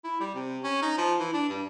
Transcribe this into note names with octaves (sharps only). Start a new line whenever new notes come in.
E4
G3
C3
C#4
D#4
F3
E3
D4
G2